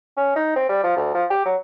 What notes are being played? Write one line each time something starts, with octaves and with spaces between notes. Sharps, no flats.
C#4
D#4
C4
G3
F3
D2
F3
G4
F#3